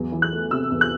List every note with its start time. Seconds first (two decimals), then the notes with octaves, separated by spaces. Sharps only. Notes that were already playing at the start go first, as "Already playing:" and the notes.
Already playing: E2 F#3
0.12 E3
0.22 F#6
0.32 A3
0.51 C3 E6
0.71 E2
0.81 F#6